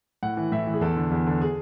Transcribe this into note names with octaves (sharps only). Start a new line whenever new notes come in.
A2 F#5
E3
A2 E5
E3
G#4
E2 A4
D3
E2
D3
G#4